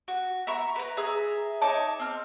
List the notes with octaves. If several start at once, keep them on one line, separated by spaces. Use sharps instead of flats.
F#4
E5 A#5 B5 C#6
B4 A#5
G#4 E5 A#5
D#4 C#5 A5 D6
C4 F6